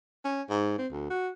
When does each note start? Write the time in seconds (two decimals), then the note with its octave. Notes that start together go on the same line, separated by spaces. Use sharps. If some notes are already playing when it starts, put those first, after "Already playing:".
0.24 C#4
0.49 G#2
0.78 C4
0.92 D2
1.10 F#4